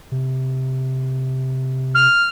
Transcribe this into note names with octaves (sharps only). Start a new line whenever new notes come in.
C3
F6